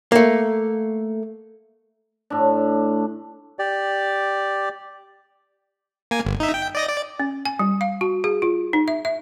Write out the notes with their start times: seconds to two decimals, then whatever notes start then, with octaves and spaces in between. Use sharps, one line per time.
0.12 A3 A#3
2.30 A2 D4
3.59 G4 D5
6.11 A#3 G#5
6.25 G1
6.40 D#4 E5
6.54 G5
6.75 D5 D#5 A#6
6.89 D5
7.20 C#4
7.45 G#5
7.59 G3
7.81 F5
8.01 F#4
8.24 G#4
8.42 F4
8.73 D#4
8.88 E5
9.05 E5